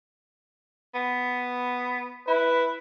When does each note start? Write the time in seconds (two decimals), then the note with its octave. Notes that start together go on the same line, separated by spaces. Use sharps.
0.95 B3
2.28 E4 B4